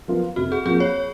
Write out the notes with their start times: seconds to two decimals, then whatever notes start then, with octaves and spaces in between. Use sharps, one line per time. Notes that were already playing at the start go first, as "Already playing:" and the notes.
0.08 F3 B3 F4 A#4
0.36 F1 F#4
0.52 G#4
0.65 F2 F3 A#3 G#4
0.80 C#5